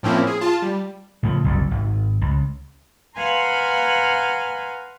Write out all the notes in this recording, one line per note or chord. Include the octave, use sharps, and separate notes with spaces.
A2 F3 A#3 C4 C#4 E4
G#4
F4 A5
G3
A2 C#3 F3
F#1 C2 F2
G#1
C#2
B4 F5 F#5 G#5 A#5 C6